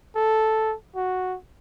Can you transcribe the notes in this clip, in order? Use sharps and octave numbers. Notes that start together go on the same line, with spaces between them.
A4
F#4